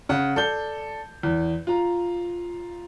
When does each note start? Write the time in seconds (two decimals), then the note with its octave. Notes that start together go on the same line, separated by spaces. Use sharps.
0.09 C#3 F#5
0.36 A4 D5 G6 G7
1.23 E2
1.67 F4 A#5